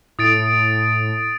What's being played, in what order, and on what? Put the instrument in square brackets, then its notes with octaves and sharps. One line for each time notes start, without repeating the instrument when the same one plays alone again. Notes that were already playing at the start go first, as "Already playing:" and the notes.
[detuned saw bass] A2 [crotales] D#6 A6 D7